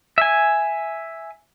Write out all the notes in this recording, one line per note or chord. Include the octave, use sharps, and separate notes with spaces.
E5 G#5